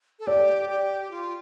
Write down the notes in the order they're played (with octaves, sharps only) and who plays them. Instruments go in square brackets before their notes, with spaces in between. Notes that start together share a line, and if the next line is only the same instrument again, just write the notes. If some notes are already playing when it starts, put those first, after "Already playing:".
[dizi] A4
[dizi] G4 [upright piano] D5
[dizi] G4
F4